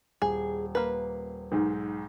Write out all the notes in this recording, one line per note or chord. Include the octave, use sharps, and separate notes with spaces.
D#1 G#4
A#3 B4
B1 G#2